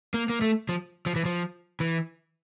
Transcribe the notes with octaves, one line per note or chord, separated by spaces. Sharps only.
A#3
A#3
A3
F3
F3
E3
F3
E3